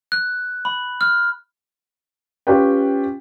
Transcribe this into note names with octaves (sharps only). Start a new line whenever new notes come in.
F#6
B5
F6
C#4 F4 G4 B4 G5